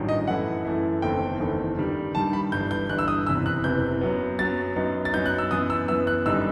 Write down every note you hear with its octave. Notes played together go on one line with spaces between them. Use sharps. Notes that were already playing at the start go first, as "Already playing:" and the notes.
Already playing: A1 G2 D#3 F#3
D#5
F#2 E3 A3 E4 F#5
F#2 E3 A3 E4
F#1 E2 D#3 A3 C4 G5
F#1 E2 D#3 A3 C4
G2 D#3 G3
G2 D#3 G3 A5
B5
G1 G2 E3 G6
G6
G1 G2 E3 F#6
E6
D#6
F#1 E2 C3 E3 E6
F#6
F#1 E2 C3 E3 G6
F#2 F#3 B3
F#2 F#3 B3 A6
F#2 F#3 B3 D#4
A6
F#2 F#3 B3 D#4 G6
F#6
E6
F#2 E3 B3 D#6
E6
F#2 E3 B3 E6
F#6
G1 F#2 D#3 G3 D#4 E6